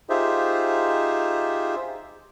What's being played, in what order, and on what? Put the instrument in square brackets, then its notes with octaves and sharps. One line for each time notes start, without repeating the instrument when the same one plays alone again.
[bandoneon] D#4 F4 G4 G#4 C5 E5